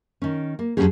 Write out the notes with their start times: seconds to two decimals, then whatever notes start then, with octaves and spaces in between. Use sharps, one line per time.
0.22 D#3 C#4
0.59 A#3
0.77 F2 B2 F#3 C#4 G4 G#4